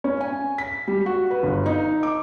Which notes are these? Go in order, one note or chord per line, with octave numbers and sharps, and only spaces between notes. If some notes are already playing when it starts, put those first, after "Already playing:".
C#4
G#5
B6
G3
F#4
B4
G1
D#4
D6